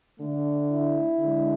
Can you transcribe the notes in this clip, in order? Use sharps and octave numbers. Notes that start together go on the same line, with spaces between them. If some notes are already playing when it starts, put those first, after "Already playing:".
D3 A3
E4
D3 G#3